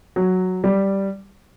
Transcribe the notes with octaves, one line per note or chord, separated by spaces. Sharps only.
F#3
G3